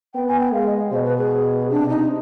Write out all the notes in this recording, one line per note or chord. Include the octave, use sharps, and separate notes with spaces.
B3 G5
G#5
G5
G#3 F5
D#5
B2 C5
B4
G#4
C3 D4
D#4